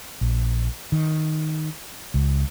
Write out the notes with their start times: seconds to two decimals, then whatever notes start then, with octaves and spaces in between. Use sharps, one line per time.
0.21 A#1
0.92 D#3
2.14 C#2